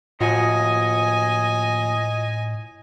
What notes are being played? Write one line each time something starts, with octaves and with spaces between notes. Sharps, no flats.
D#2 A2 F3 F#4 D#5 G#5